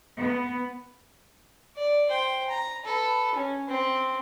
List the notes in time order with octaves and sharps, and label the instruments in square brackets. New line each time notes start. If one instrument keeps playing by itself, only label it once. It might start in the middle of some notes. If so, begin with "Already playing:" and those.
[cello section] B3
[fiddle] D5
C5 G5
A#5
A4 B4
C#4
C4